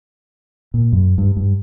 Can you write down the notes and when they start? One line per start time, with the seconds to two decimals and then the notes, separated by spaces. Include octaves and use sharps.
0.74 A#2
0.92 F#2
1.18 G2
1.37 G2